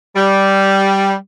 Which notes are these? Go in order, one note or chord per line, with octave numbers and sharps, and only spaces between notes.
G3